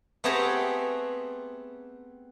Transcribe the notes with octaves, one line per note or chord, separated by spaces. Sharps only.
A3 B3 C4 G4 G#4 A#5